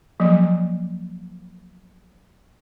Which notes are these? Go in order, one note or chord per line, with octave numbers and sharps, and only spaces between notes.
F3 F#3 A#3